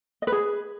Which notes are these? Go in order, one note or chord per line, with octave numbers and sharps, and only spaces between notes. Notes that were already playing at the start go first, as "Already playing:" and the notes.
D#5
B4
G#4